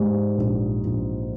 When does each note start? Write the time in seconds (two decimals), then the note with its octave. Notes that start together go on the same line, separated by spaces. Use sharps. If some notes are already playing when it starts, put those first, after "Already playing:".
Already playing: G#2 G3
0.38 A#1
0.85 A#1